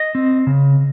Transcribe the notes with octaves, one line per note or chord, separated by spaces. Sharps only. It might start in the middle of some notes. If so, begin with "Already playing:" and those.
Already playing: D#5
C4
C#3